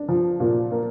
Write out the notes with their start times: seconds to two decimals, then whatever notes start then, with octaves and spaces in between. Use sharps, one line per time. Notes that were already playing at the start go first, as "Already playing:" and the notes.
Already playing: D4
0.09 F3
0.40 A#2
0.71 A#3